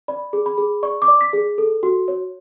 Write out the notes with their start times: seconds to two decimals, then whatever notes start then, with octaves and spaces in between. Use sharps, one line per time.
0.08 D5 B5
0.33 G#4
0.46 B5
0.58 G#4
0.83 D5 C#6
1.02 D6
1.08 D5
1.21 B6
1.33 G#4
1.58 A4
1.83 F#4
2.08 C#5